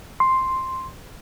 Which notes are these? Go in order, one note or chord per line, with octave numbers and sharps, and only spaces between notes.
C6